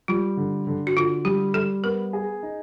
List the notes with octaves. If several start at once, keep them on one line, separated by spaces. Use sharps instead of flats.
G3 F4
D3
D3
F#4
D3 F4
G3 G4
G3 A4
B3 A#4
G#4
D#4